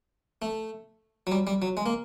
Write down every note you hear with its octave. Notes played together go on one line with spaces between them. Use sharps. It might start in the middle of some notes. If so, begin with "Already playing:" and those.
A3
F#3
G3
G3
F#3
G#3
A#3